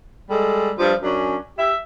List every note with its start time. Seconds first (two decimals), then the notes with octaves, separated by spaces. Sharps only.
0.30 G3 G#3 A4
0.78 G2 F3
1.03 F#2 C#4 D4
1.57 G4 E5